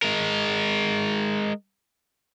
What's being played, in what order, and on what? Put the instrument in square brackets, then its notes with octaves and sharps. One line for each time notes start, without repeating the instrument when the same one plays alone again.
[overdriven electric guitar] G#3 A#4